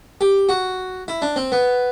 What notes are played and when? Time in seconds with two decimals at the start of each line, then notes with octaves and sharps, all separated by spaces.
0.21 G4
0.49 F#4
1.08 E4
1.22 D4
1.36 C4
1.52 B3